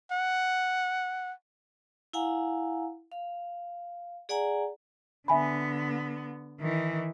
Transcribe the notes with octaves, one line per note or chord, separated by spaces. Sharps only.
F#5
E4 F5 F#5 G#5 A#5
F5
G#4 D5 F#5 G#5 A#5
D3 B3 E5 G#5 B5
D#3 E3